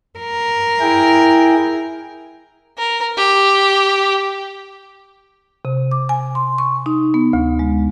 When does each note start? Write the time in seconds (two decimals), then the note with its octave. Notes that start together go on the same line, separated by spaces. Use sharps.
0.19 A#4
0.80 E4 G#4 G5
2.78 A#4
3.17 G4
5.65 C3
5.91 D6
6.09 G#5
6.35 C6
6.58 C#6
6.86 D#4
7.14 B3
7.33 D2
7.59 G#3